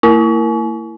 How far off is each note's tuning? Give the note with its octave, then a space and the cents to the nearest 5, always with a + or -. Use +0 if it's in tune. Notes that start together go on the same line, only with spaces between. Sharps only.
A#3 -40 E4 +10 G#5 +40